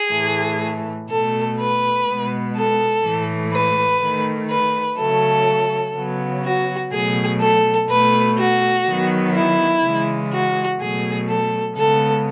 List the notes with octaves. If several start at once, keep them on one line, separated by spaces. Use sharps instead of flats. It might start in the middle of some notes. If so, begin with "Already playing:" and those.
Already playing: G#4
A2 E3 A3
B2 A3 A4
B4
B2 G#3 B3
A4
A2 E3 A3
B4
D#3 A3
B4
C#3 F#3 A3 A4
C#3 F#3 B3
F#4
B2 F#3 A3 G#4
A4
B2 A3 B4
F#4
D#3 F#3 B3
E4
C#3 E3 G#3
F#4
B2 F#3 A3 G#4
A4
C#3 G#3 B3 A4